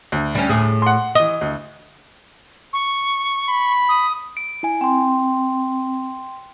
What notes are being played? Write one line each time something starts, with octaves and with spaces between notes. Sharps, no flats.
D2
G3 C#4
A2 G#4
F#5 C6
E3 D#5 G7
D2
C#6
B5
D#6
D7
E4 G#5
C4 G5 C6